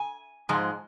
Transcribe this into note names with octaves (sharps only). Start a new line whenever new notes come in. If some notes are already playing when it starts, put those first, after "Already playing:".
Already playing: G#5
G#2 F3 G#3